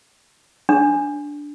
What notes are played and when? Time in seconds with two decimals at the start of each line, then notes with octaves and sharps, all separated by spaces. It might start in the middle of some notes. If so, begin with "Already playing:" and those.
0.69 D4